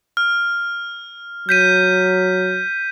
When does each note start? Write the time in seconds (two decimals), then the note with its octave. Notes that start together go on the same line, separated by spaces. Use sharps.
0.17 F6
1.49 F#3 G6 B6 D#7